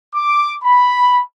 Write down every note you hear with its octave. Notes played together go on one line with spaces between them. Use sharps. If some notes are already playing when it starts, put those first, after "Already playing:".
D6
B5